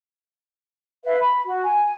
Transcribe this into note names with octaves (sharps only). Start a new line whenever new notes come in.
B4 E5 F5
B5
F#4
G#5